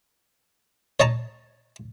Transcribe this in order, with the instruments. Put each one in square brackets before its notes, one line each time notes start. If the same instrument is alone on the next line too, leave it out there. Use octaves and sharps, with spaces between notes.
[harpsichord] C#5 D#5 A5 A#5